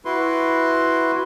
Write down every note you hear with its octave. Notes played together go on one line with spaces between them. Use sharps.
E4 F#4 B4 C6